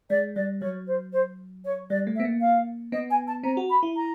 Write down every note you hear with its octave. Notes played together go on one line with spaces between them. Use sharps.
G#3 D5
G3 D5
F#3 C#5
C5
C5
C#5
G3 D5
A3
E5
B3
A#3
F5
B3 D#5
G#5
A5
C4 A#5
F#4
B5
E4
A#5